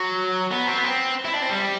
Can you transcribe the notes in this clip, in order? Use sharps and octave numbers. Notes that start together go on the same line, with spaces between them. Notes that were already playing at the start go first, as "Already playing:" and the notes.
Already playing: F#3
B3
C4
B3
C4
E4
D4
C4
G3